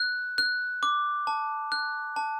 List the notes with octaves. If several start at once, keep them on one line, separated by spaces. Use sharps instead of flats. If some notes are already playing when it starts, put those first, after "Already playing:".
Already playing: F#6
F#6
D6
A5
F#6
A5